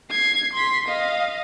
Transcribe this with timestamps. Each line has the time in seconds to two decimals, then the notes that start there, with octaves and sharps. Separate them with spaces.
0.11 G#6 C7
0.54 C6 B6
0.88 D#5 F5